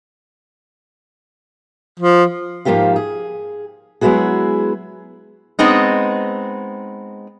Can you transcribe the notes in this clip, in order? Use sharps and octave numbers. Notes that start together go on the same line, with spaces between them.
F3
G#2 F3 A#3 F4 G4 F5
G#4
F#3 G#3 B3 E4 F#4 G#4
G#3 B3 C4 D#4